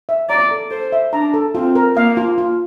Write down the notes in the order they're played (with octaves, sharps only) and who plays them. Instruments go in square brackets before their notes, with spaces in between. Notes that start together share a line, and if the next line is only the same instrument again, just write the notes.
[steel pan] E5
[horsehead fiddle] D5 [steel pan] A#5
[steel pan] A4
[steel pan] A4 [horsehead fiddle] C5
[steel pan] E5
[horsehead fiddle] D4 [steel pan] A#5
[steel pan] A4
[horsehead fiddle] C4 [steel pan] F4
[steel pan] A#4
[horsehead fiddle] A#3 [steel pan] F5
[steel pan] F4
F4